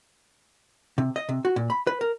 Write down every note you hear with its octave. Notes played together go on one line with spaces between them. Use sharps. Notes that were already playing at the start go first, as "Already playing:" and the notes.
C3
D#5
C3
F#4
A#2
B5
B4
A#4